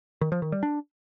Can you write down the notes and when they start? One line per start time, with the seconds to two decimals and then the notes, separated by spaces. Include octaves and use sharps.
0.21 D#3
0.32 F3
0.42 D#3
0.52 G3
0.63 D4